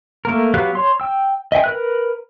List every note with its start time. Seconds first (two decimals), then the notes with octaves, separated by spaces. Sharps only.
0.25 A3 A#3 A#4
0.54 F#3 B3 G4 F5 F#6
0.75 C#5 C6
1.00 G5 E6
1.52 D#5 E5 G5 G#5
1.64 A#4 B4 F#6